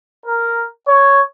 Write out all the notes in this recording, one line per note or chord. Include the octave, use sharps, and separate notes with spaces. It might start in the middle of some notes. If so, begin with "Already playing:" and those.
A#4
C#5